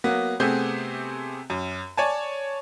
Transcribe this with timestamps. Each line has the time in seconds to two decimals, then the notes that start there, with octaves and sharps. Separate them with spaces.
0.04 F#3 A#3 B3
0.40 C3 A3 B3 C4 G#4 G6
1.50 F#2
1.97 C#5 D5 G#5 A5